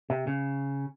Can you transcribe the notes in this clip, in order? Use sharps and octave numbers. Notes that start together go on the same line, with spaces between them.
C3
C#3